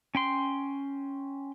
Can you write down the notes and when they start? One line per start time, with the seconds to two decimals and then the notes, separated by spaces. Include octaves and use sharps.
0.15 C#4 G5 C6